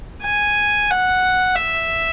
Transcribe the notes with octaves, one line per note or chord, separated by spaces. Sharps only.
G#5
F#5
E5